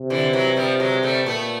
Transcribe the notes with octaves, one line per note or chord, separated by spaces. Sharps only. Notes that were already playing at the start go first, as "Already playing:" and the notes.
Already playing: C3
D3 E3
E3 F#3
F3 G3
F#3 G#3
G3 A3
A#2 A3 B3